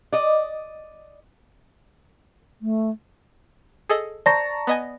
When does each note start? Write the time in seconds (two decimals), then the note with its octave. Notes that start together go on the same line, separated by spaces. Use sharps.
0.12 D5 D#5
2.62 A3
3.89 G#4 A4 D#5
4.26 C5 D5 A5 A#5 C#6 A#6
4.67 B3 D#5 G#5